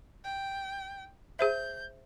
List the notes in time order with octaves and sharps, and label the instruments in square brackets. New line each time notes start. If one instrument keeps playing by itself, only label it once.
[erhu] G5
[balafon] G#4 C5 E5 [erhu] G6